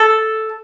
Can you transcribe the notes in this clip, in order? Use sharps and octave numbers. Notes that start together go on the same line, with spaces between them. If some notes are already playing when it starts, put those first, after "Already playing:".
Already playing: A4